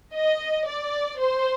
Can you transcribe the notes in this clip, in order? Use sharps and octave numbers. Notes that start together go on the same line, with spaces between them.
D#5
D5
C5